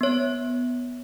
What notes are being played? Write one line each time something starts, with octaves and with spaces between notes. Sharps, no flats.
B3 C#5